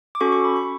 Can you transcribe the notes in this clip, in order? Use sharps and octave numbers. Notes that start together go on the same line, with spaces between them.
D6
C#4 F#4 A4 C#6
C#6
B5
C#6